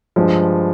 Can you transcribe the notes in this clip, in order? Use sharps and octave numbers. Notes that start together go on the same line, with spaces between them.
G2 F3 G#3